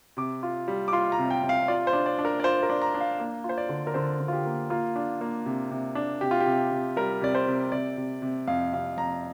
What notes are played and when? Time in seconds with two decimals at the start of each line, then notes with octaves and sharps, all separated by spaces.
0.17 C3 D6
0.43 F4
0.68 G3
0.88 D6
0.93 F4 C6
1.12 A#5
1.18 C3
1.30 G5
1.43 C3
1.49 F5
1.68 F4 D5
1.87 C5
1.93 D4
2.06 D5
2.19 D4
2.25 A#4
2.40 D5
2.44 F4 C5
2.63 A#4
2.69 D4
2.82 A#5
2.95 D4
3.01 F5
3.20 A#3
3.44 F4
3.49 C5
3.58 D5
3.69 D3
3.87 A#4
3.94 D3 C5
4.20 D3
4.28 F4
4.33 G4
4.46 A#3
4.70 A#3 F4
4.96 D4
5.21 A#3
5.46 C3
5.71 C3
5.95 D4
6.21 C3 G4
6.31 F4
6.40 G4
6.46 C3
6.71 C3
6.96 G3 A#4
7.21 C3 D5
7.35 C5
7.47 C3
7.72 C3 D5
7.97 C3
8.22 C3
8.48 F2 F5
8.73 C3 F5
8.97 F2 A#5